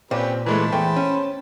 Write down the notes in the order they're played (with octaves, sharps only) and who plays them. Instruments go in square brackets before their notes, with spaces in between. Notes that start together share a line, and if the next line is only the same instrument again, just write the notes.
[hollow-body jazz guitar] A#2 [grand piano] C4 [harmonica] C#4 G4 B4
[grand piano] E3 G#3 A3 [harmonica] C5 A5 B5
[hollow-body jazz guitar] E2 A3 [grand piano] G5
[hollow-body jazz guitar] C#4